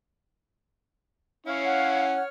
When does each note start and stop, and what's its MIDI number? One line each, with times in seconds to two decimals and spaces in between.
1.46 2.18 61
1.46 2.18 64
1.46 2.06 73
1.46 2.06 77
1.65 2.23 78
2.15 2.29 73
2.15 2.29 89